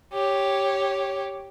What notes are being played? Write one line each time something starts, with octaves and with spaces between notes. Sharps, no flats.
G4 C#5